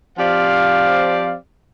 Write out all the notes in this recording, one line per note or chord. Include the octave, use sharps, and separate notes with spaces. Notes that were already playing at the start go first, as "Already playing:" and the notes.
F3 C4 G4 D5 F5